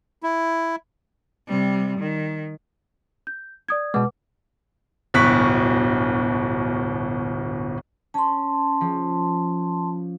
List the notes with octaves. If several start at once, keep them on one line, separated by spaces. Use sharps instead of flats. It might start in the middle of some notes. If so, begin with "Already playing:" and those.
E4
C3 G3
D#3
G6
D5 D#6 G#6
B2 G#3 B4 F#5 D6
D1 G1 B2 C#6 F#6 B6
C#4 A5 C6
F3